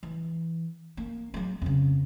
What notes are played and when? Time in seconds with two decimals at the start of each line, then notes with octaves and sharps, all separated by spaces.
0.03 E3
0.97 A#3
1.34 F#3 G#3
1.62 F2 C#3